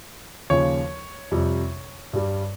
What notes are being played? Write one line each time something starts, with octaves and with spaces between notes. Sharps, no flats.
D#2 C#3 F3 C#5
F2 C3 G3
G2 G3